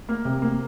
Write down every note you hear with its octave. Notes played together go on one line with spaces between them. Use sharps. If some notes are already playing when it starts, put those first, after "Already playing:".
A#3 A#4
C3
A#3